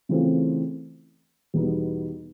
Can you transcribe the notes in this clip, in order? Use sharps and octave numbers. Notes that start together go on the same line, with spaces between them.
C#3 E3 A3 C4 F4
E2 B2 G3 B3 D#4